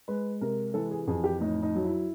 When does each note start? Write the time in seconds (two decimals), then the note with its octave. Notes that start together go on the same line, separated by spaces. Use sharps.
0.08 G#3 B4
0.41 C3 A#4
0.74 E3 A4
0.91 G#4
1.07 F2 G#4
1.24 G4
1.41 A2 D#4
1.63 D#4
1.75 F#3
1.85 E4